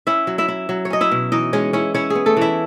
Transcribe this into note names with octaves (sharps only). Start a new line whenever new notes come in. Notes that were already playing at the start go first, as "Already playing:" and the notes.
C#4 E4 E5
F#3
E4 E5
E4
F#3
C#5
C#4 D#5
E4 E5
B2
E3 D#4 D#5
G#3 C#4 C#5
C#4 E4 C#5
C#4 E4 C#5
B3 G#4
A3 A4
E3 E4 E5